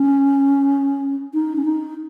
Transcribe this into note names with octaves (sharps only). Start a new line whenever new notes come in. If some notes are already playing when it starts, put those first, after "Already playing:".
Already playing: C#4
D#4
C#4
D#4